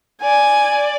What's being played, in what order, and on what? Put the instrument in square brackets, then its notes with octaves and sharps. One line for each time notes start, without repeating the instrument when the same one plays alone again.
[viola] D5 [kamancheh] G#5